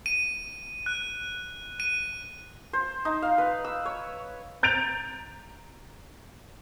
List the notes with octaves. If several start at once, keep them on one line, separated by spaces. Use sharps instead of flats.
D#7
F#6
D#7
C5
D#4
F5
B4
E6
C#5
A#5 G6 A6 D7 F7